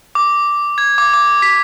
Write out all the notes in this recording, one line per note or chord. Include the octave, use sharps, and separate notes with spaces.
D6
G#6
D6
D6
B6